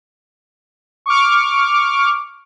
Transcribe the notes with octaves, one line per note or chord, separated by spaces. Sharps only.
C#6 D6 F6